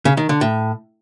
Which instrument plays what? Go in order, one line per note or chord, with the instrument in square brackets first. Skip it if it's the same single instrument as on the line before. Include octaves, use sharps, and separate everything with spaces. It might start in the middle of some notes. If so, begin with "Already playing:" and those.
[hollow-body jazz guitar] C#3
D#3
D3
A2